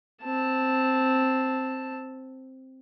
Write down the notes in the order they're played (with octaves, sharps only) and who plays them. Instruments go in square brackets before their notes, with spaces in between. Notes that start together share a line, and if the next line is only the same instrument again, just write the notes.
[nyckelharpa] C4 A5